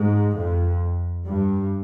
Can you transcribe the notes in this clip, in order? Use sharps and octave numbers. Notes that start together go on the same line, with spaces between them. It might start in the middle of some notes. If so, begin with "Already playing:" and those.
Already playing: G#2
F2
G2